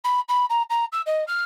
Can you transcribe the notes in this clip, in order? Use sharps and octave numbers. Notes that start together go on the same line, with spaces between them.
B5
B5
A#5
A#5
E6
D#5
F6